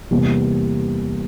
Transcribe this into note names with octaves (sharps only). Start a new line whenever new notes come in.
E2 C3 G3 A#3